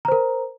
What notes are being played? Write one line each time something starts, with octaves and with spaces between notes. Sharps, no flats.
A#4 C5 A#5